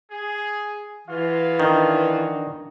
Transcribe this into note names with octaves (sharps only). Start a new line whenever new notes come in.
G#4
E3 F4 F#4 G#4 F5
D#3 D4